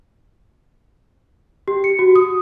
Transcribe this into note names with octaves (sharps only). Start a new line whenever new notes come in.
G4
C#7
F#4
D#6